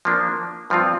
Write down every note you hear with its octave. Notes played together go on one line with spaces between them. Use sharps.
F3 A#3 D4
G2 F3 C4 F4